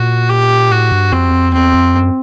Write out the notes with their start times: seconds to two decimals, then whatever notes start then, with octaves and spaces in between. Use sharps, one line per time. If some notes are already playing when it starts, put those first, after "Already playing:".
Already playing: A#2 F#4
0.29 G4
0.70 A2 F#4
0.92 G2
1.13 F2 C4
1.29 E2
1.33 F2
1.53 E2 C4
1.74 F2
1.95 F#2